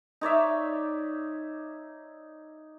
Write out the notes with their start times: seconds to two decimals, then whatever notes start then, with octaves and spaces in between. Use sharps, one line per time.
0.21 D#4 C#5 D5 E5